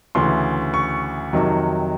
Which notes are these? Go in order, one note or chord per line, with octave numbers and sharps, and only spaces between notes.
D2 C#3 E3 C6
C#6
F2 C3 D#3 F#3